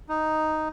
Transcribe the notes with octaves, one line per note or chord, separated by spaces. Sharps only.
D#4